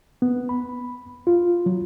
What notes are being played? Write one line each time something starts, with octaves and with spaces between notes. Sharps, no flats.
B3
B5
F4
F#3